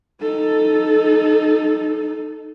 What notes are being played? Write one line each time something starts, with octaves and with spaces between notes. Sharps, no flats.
D#4 A4